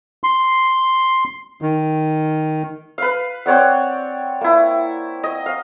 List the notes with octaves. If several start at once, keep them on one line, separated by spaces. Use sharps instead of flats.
C6
D#3
B4 F5
C4 C#5 D5 F#5
A#3 E4
D#5
F5